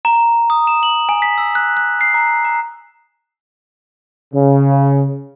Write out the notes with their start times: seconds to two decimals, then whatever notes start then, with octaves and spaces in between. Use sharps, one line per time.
0.05 A#5
0.50 D#6
0.67 E7
0.83 F#7
1.09 G#5
1.22 B6
1.38 E6
1.55 F#6
1.77 F#6
2.01 C7
2.14 A#5
2.45 A#5
4.34 C#3